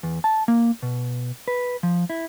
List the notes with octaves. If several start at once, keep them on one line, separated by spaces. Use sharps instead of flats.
E2
A5
A#3
B2
B4
F3
E4